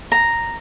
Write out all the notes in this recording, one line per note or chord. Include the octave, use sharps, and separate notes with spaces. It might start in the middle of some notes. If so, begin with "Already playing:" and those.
A#5